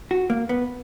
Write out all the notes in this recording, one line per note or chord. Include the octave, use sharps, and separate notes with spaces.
F#4
A#3
B3